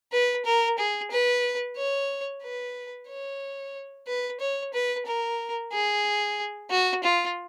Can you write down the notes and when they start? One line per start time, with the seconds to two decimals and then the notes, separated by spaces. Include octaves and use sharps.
0.12 B4
0.45 A#4
0.79 G#4
1.11 B4
1.77 C#5
2.43 B4
3.08 C#5
4.07 B4
4.40 C#5
4.74 B4
5.05 A#4
5.72 G#4
6.70 F#4
7.04 F4